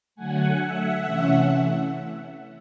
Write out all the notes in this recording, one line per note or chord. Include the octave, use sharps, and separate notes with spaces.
D3 F#3 A3 F#5 G#5
E5 F#5
C3 E3 A3 C#4